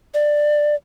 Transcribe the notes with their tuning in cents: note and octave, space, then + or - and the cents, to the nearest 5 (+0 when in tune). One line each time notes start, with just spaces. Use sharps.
D5 +10